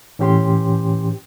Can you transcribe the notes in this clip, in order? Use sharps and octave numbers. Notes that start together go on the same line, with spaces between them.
A2 E3 C#4 G4 G5 C6